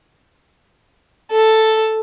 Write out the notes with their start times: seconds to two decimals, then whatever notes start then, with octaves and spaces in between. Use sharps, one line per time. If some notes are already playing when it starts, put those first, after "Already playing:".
1.31 A4